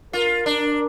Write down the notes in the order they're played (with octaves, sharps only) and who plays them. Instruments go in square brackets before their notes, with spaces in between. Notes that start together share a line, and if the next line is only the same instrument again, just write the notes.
[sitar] F4 [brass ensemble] A#4
[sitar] D4